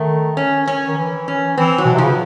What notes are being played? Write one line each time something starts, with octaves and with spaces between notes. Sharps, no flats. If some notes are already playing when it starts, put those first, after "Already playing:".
Already playing: D#3 A3
C#4
C#4
D#3
E3
C#4
E3 C4
F#3
B2
C3
C#3 F3